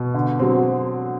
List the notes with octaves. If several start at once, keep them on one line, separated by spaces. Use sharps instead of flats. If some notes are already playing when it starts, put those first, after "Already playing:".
Already playing: B2
D3
F#3 C4